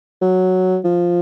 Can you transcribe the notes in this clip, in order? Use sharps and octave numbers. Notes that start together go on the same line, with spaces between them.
F#3
F3